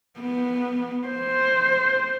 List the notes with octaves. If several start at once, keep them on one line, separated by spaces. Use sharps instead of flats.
B3
C5